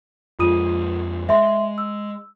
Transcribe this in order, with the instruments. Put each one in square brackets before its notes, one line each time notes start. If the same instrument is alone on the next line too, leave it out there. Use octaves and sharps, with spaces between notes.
[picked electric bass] F2 G#3 [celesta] F4 D#6 D#7
[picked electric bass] G#3 [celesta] E5 C6
[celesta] E6